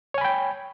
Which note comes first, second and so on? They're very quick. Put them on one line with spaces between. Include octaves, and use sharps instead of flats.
C#5 G#5 B5 G5